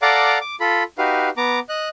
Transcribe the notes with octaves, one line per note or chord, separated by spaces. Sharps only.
A4 D5 F5 F#5 A#5 D6
D6
F4 A4 B5
D#4 F#4 G4 B4 F5
B3 A#5 D6
D#5 F#6